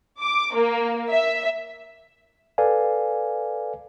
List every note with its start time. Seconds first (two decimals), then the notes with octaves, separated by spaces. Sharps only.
0.19 D6
0.54 A#3
1.09 E5
2.58 A4 B4 D5 F5 G#5